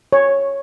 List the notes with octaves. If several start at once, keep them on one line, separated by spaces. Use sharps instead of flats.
C#5